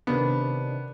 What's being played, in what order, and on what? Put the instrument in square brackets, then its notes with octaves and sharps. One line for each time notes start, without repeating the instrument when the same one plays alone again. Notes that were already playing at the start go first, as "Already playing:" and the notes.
[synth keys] C3 D#3 D4 [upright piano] B3